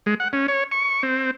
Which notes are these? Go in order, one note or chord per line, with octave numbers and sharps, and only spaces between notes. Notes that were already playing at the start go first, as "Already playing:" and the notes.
G#3
F#5
C#4
C#5
C#6
C4